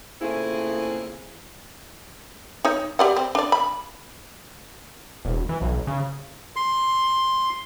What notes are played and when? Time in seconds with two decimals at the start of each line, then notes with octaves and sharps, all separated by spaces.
0.20 A#2 C#3 A3 C4 E4 G#4
2.64 D#4 C#5
2.99 G4 D5 F#5
3.16 C4
3.35 D4 D5
3.52 B5
5.25 E1
5.49 E3
5.61 B1
5.87 C#3
6.56 C6